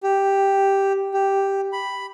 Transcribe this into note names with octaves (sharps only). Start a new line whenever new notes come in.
G4
G4
B5